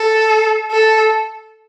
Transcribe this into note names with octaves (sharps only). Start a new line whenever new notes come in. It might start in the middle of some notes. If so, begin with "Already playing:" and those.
Already playing: A4
A4